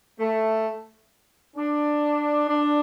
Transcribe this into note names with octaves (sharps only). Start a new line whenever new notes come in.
A3
D4
D4